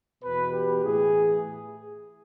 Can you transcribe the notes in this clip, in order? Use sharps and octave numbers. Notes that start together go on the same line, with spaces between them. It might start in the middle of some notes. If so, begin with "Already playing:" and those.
E2 B2 B4
G4
A2 E3 G#4